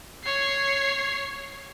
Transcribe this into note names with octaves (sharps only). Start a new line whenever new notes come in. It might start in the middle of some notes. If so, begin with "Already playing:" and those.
C#5 C7